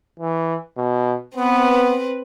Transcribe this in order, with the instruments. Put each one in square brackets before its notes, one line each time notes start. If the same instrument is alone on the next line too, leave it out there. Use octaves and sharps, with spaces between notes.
[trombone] E3
B2
[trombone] B3 [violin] C4 B4